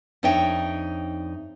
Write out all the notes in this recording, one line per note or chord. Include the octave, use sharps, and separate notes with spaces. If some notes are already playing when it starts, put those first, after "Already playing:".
F2 D4 D#4 C#5 E5 G5